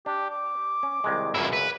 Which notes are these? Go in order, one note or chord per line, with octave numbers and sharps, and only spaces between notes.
D4 G4
D6
C#4
C2 D#3 G#3
C#2 F#2 C#3 E4
B4